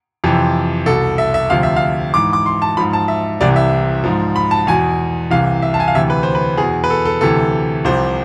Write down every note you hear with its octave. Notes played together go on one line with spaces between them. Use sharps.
F2 C3 E3
C2 B2 A4
E5
E5
D2 C3 F3 F5
E5
F5
G#2 E3 D6
D6
C6
A5
G#2 F3 B5
A5
E5
C2 C3 E3 D5
E5
G#2 F3
B5
A5
E2 B2 G#5
C2 C3 E3 F5
E5
A5
G#5
F5
D2 C3 E3 E5
B4
C5
B4
E2 B2 G#4
B4
A4
A4
D2 C3 E3 A4
C2 C3 F3 C5